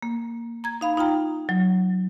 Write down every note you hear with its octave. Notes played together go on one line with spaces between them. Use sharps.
A#3
A#5 G#6
D#4 F5 B5
D#4 F4 G5 A#5
F#3